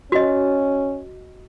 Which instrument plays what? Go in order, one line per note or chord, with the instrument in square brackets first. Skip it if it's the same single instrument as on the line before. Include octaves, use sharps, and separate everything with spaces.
[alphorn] C#4 [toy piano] F#4 D#5